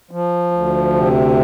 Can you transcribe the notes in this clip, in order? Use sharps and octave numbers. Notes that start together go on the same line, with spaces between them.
F3
D2
C3